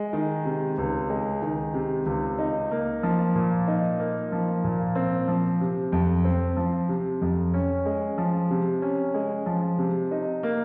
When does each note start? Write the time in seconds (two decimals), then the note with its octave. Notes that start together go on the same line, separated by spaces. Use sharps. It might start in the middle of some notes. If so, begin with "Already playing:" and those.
Already playing: G#3
0.13 D#3
0.45 C3
0.78 C#2
1.10 G#3
1.42 D#3
1.74 C3
2.06 C#2
2.39 D#4
2.71 A#3
3.03 F3
3.35 A#2
3.68 D#4
3.99 A#3
4.32 F3
4.64 A#2
4.95 C4
5.28 F3
5.61 C3
5.92 F2
6.25 C4
6.57 F3
6.89 C3
7.21 F2
7.54 C#4
7.85 G#3
8.18 F3
8.50 C3
8.82 C#4
9.14 G#3
9.46 F3
9.78 C3
10.11 D#4
10.43 A#3